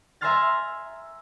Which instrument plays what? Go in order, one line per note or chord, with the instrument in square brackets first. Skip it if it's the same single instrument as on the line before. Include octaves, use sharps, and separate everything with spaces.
[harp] E5 G#5 A#5 C6 F6 A6